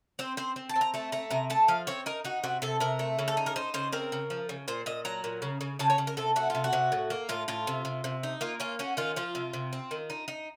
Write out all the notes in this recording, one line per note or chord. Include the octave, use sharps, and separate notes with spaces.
C4 C5
C4 C5
C4
A5
C4
A#5
A3 A5
A3 A#5
C3 A#5
A3 A5
F3 F5
C4 C#5
D#4 A#4
D#4 F#4
C3 F#4
C3 A4
C3 A#4
A3
C#3
A4
D#4
A#4
D#4 C5
C#3 C5
C4 A#4
C#3
F3
C#3
A#2 C5
A#2 D#5
F#3 A#5
A#2
C#3
C#3
C#3 A5
C#5
C#3
A#4
C3 A4
A3 F#4
C3 F4
F#4
C3
A2
A#3
A2 F4
A2 F4
C3
C3
C3
D#4
A#3 F4
C#4 F4
C#4 F#4
D#3 F4
F3 F4
C3
C3
C4
D#3
D#4
D#4